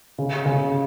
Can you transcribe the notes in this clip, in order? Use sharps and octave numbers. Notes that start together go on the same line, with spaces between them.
C#3
C#3